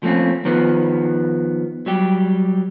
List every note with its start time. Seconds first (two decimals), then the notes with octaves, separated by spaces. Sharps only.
0.03 F3 A3 A#3 C4 C#4
0.45 D#3 F3 B3
1.86 F#3 G3 G4